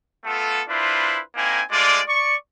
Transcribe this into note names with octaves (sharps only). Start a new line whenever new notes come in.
A3 B3 F4 A4
D4 E4 F4 B4 C5
A#3 C4 D#4 E4 G#5
G#3 A3 F4 D5
D5 C#6